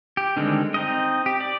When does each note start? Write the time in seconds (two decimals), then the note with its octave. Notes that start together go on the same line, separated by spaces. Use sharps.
0.17 G4
0.37 D3 D#3 G3 G#3 C4
0.74 C4 D#4 D#5
1.26 G4
1.40 D5